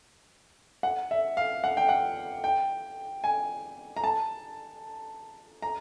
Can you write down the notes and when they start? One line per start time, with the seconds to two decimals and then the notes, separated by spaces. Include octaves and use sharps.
0.83 F#5
1.11 E5
1.37 F5
1.64 F#5
1.77 G5
1.89 F#5
2.44 G5
3.24 G#5
3.97 A#5
4.04 A5
5.62 A#5